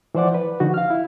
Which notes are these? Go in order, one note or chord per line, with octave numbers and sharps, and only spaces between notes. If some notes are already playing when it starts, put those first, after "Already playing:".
E3 F3 C5 D5 F#5 D6
B4
D3 F3 D#4 F#4
F5 F6
E4